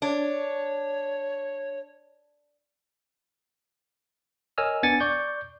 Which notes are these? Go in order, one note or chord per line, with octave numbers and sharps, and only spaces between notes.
D4 C#5
A#4 C#5 D#5 G#5 E6 F6
B3 D4 G#5 A6 C#7
D5 C#6 G6